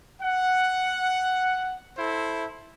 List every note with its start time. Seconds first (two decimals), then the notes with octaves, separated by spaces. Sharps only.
0.21 F#5
1.97 E4 A4 C5